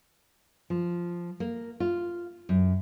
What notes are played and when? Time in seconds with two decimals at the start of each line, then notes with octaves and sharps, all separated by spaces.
0.70 F3
1.40 A#3
1.80 F4
2.49 F#2